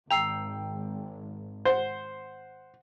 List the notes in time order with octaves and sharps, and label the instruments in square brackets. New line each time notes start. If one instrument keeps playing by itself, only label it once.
[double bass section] G#1 [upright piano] G5 [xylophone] A#5 E6 C7
[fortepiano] C5 [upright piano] F#5